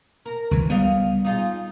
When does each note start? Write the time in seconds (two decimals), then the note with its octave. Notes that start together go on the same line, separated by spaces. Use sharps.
0.26 A#4
0.51 C#2 E3
0.70 G3 B3 D#5 F5
1.24 D#4 F4 G#4